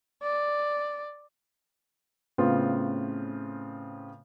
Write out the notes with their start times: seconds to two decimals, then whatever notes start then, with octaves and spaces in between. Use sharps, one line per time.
0.22 D5
2.38 A2 C#3 B3 C4 F4